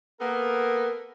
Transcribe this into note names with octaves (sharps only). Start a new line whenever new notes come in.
A#3 B3 A4 A#4